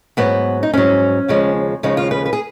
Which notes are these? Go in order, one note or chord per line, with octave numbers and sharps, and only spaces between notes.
G#2 F#3 B3
D#4
G#2 F#3 C#4
D#2 C#3 F3 G#3
D#2 C#3 F3 G#3 D#4
F4
B4
B4
G#4